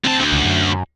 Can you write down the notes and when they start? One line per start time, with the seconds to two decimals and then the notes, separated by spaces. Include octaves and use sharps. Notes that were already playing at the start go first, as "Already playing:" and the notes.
0.05 D2 C4 A5
0.20 D2
0.32 C#2
0.45 F#2